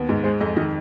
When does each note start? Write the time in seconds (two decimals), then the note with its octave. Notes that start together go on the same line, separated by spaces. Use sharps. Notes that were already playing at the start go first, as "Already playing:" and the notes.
Already playing: D#2 B3
0.09 G#2
0.24 G#3 C5
0.41 F2 D#5
0.56 D#3 D#5